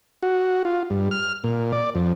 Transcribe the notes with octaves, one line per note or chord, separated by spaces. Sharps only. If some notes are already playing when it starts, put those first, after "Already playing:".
F#4
F4
G2
F6
A#2
D5
F2